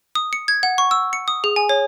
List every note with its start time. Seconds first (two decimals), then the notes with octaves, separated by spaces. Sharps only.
0.15 D#6
0.33 C#7
0.48 G#6
0.63 F#5
0.78 C#6
0.91 E6
1.13 C#7
1.28 D#6
1.44 G#4
1.56 G#5
1.69 C#5